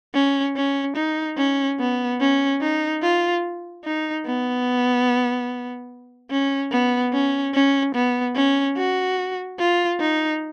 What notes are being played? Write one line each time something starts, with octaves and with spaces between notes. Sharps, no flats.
C#4
C#4
D#4
C#4
B3
C#4
D#4
F4
D#4
B3
C#4
B3
C#4
C#4
B3
C#4
F#4
F4
D#4